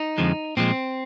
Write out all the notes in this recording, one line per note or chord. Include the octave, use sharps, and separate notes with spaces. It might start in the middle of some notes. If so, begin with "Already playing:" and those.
Already playing: D#4
F2 D3 F3 G#3
A#2 F3 G#3 C4